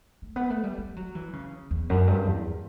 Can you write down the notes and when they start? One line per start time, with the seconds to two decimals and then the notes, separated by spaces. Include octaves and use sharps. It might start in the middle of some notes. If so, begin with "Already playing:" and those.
0.22 A3
0.36 B3
0.50 A3
0.64 G3
0.78 G3
0.96 F#3
1.15 E3
1.33 C#3
1.71 E2
1.90 F#2
2.07 G2
2.27 E2